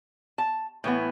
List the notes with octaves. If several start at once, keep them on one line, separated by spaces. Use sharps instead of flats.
A5
A2 E3 B3